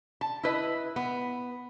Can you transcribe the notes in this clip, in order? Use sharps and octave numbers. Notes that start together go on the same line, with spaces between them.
A5
E4 B4 D#5
B3